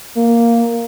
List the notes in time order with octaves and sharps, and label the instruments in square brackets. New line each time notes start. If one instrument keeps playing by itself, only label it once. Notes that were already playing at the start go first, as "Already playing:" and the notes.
[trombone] A#3